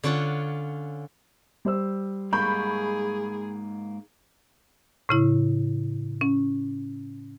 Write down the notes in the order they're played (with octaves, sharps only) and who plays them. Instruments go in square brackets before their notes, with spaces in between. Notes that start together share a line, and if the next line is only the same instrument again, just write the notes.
[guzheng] D3 C#4 F4 C#5 F#5
[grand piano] G3 C5 E6
[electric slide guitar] G#2 A#3 [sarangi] G#4 [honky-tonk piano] B5 C#6 G6
[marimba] A2 C#3 E4
C#4